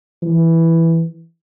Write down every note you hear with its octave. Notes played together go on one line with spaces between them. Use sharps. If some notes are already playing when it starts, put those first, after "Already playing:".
E3